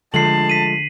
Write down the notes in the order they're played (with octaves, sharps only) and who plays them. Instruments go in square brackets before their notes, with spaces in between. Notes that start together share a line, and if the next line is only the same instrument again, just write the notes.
[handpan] D3 [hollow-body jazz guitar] F3 G#3 A3 [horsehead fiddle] A5 [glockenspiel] C7 F#7
[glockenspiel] B6 D#7